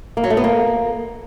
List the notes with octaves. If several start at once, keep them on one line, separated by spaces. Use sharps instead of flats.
A#3
F#3
A3
B3
A#3